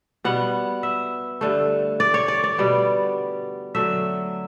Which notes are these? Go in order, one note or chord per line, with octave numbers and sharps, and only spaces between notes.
B2 G3 B3 F#5
E5
G2 D3 A3
D5
C#5
D5
D5
B2 G3 B3
D3 F#3 A3 E5